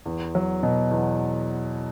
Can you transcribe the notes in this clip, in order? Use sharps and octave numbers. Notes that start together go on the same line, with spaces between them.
E2
F#3
B2
E2